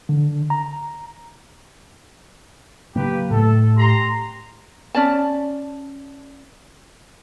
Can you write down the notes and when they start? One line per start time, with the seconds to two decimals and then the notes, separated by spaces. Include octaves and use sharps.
0.09 D3
0.50 A#5
2.96 C#3 F#3 A#3 G4 B4
3.31 A2 A3 A4
3.77 G4 A#5 C6
4.95 C#4 D5 A5